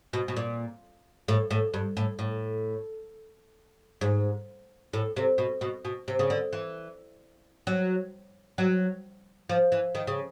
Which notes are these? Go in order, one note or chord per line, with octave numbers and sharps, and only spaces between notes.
B2
B2
A#2
A2
A2
G2
A2
A2
G#2
A2
C3
B2
B2
B2
C3
C#3
D3
E3
F#3
F#3
F3
E3
D#3
C#3